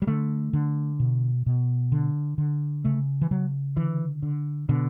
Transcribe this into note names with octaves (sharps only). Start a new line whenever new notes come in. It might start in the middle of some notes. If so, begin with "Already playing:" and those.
G3
D3 A3
D3
B2
B2
D3
D3
C#3 A3
E3
C#3 F#3
D3 E3
D3
B2 D3